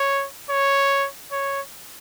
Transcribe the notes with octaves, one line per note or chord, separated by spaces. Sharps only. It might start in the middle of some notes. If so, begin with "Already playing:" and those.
Already playing: C#5
C#5
C#5